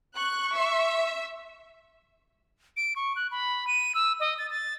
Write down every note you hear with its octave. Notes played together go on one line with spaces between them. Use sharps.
C#6 F#6
E5
D7
C#6
F#6
B5
D#7
E6
D#5
A6
A6